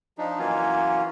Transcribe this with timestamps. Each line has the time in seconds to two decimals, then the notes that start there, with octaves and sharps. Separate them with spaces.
0.18 F3 D4 D#4
0.39 E3 F#3 A#3 C#4 F4